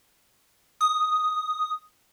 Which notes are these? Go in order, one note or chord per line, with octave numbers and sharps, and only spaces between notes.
D#6